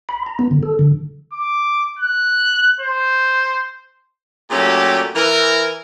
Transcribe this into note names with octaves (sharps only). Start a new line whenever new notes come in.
B5
A#5
B3
D3
A4
D3
D6
F#6
C5
A#2 F#3 A3 C#4 G4
E3 A#4